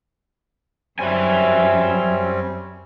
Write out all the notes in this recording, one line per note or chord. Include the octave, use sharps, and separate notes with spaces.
F#2 G3 C4 C#4 E5 G#5